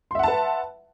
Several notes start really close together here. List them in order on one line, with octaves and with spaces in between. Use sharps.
C6 E5 F#5 A5 B4